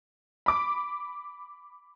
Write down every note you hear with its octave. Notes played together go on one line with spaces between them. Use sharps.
B5 D6